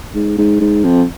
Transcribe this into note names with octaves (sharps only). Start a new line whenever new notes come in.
G#2
G#2
G#2
F2